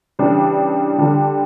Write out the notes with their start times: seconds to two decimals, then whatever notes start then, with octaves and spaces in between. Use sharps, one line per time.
0.19 C#3 E3 G3 D4
0.98 D3 G3 D4